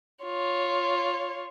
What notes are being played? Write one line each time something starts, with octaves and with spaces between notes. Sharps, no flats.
F4 C#5